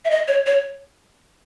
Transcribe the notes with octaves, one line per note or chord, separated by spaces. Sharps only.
E5
D#5
C#5
C#5